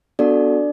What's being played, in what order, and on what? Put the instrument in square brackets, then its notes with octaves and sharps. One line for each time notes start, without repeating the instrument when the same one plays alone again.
[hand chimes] B3 D4 F#4 A4 D5